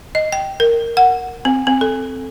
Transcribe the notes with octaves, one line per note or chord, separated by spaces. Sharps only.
D#5
G5
A#4
F#5
C4
C4
A4